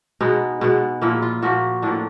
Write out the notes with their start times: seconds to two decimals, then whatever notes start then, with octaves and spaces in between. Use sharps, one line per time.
0.21 B2 G#3 B3 D#4
0.61 B2 G#3 B3
1.01 A#2 F3 A#3 E4
1.22 F4
1.42 A#2 F3 A#3 F#4
1.82 A2 F3 A#3 D4